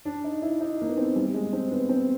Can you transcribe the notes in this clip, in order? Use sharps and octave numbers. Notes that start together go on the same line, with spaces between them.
D4
D#4
E4
D#4
A#3
B3
C4
G3
G#3
C4
B3
C4